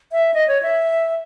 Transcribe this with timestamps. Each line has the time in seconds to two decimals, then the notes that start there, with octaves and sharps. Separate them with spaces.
0.12 E5
0.34 D#5
0.48 C#5
0.63 E5